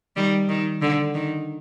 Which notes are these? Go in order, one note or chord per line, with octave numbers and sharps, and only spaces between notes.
D#3 G3
D#3
D3
D#3